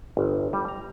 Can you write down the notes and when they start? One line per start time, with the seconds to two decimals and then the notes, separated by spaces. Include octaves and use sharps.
0.17 G1
0.53 G3
0.68 A#5